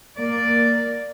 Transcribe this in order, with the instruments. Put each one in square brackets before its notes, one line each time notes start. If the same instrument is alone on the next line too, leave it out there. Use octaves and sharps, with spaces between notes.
[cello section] A#3 D5